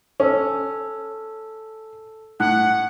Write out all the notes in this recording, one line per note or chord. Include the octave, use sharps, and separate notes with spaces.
C#4 A4 A5 E6
A2 F#5 F#6